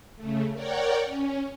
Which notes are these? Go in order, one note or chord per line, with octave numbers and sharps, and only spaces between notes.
C#3 A3
A#4 C#5 D5 F#5 G5
C#4